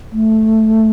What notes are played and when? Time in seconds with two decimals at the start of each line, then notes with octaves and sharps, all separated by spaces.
0.12 A3